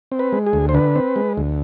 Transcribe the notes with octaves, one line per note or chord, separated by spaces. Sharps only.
C4
B4
G#3
G#4
D2
C5
D3 B4
C4
G#3
D2